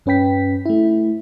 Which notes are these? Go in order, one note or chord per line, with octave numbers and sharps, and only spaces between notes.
G2 C#4 B4 G5 B6
A3 E4